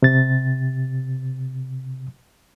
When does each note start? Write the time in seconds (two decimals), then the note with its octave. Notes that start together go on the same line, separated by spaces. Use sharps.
0.02 C3 A6